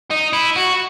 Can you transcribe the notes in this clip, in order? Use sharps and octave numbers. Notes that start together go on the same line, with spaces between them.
D#4
E4
F#4